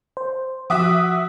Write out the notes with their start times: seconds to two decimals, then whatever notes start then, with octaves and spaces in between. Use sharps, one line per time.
0.17 C5
0.70 F3 F#4 E5 F#5 D6 D#6